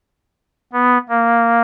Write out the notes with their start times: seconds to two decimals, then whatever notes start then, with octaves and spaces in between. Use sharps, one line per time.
0.73 B3
1.09 A#3